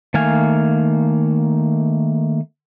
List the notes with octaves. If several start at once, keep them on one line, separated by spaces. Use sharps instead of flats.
D#3 A3 A#3 F5 G#5